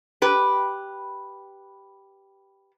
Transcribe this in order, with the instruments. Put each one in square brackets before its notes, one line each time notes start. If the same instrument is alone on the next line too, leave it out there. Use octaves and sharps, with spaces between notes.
[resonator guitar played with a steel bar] G4 B4